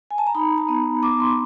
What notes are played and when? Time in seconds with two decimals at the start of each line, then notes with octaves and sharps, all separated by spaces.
0.11 G#5
0.18 A5
0.27 A#5
0.35 D#4 B5
0.58 A5
0.68 B3
1.03 B3 D6
1.20 C6